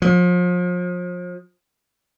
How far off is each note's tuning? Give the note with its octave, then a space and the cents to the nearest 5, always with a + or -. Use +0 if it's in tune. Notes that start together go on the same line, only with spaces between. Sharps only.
F3 +35